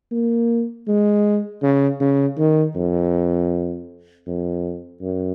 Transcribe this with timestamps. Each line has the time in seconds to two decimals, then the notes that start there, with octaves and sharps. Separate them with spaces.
0.11 A#3
0.88 G#3
1.62 C#3
2.01 C#3
2.38 D#3
2.75 F2
4.27 F2
5.02 F#2